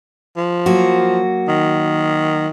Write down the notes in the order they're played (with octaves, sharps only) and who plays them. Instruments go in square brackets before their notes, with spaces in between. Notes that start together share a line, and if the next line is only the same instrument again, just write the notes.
[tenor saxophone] F3
[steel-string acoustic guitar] F#3 A#3 F#4
[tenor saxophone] D#3